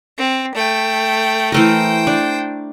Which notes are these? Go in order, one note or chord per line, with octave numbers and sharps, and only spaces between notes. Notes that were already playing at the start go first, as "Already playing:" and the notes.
C4
A3 G5
E3 A3 A#4 C5 G5
D4